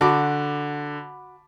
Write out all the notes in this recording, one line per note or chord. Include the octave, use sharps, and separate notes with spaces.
D3 F#4 A5 B5 D6